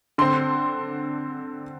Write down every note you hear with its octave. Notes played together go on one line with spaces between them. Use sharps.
D3 C4 C6